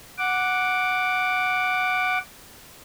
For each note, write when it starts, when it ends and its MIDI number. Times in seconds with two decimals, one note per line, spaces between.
0.18 2.18 78
0.18 2.18 86